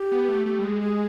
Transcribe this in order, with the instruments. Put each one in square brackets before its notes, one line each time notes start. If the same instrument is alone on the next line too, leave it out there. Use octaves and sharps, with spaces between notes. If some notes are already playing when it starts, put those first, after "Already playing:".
Already playing: [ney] G4
[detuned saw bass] B3
A3
[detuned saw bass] A3 [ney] G4
[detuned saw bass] G3
[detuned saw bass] G#3 [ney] G#4
[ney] G#4